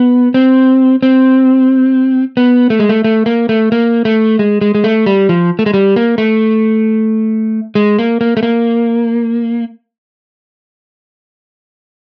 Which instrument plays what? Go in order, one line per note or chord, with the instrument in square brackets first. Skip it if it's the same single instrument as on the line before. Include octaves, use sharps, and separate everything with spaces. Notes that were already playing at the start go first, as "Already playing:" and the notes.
Already playing: [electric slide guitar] B3
C4
C4
B3
A3
G#3
A3
A3
A#3
A3
A#3
A3
G#3
G#3
G#3
A3
G3
F3
A3
G#3
G3
A#3
A3
G#3
A#3
A#3
A3
A#3